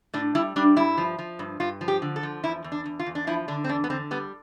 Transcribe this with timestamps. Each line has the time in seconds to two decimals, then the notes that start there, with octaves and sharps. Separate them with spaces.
0.14 A2 D4
0.35 G3 E4
0.56 G3 D4
0.76 G2 E4
0.98 F3
1.19 F3
1.39 G2
1.60 G2 F4
1.81 F3
1.88 G4
2.02 D3
2.16 A4
2.23 F3
2.44 E2 E4
2.64 E2
2.72 D4
2.86 E2
2.99 F4
3.06 E2
3.15 D4
3.27 F3 E4
3.48 D3 D4
3.64 C4
3.69 E2 D4
3.84 B3
3.90 D3 C4
4.11 G3 B3